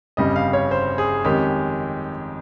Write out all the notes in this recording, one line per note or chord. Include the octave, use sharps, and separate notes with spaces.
G1 F2 C#3 G3 D#5
F5
C#5
C5
G#4
F2 D#3 G#3 C#4 G4